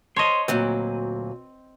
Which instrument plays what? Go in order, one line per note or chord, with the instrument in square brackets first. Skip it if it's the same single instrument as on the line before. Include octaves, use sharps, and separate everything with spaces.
[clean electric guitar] C5 A5 C6 [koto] C#5 D#5
[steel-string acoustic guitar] D2 A#2 F#3 [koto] C4 [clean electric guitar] B4